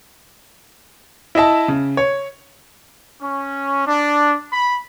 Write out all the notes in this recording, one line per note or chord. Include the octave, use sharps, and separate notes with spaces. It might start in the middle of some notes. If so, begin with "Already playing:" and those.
E4 D#5 E5 A5
C#3
C#5
C#4
D4
B5